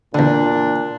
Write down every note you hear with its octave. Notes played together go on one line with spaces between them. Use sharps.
E2 A#2 D3 D4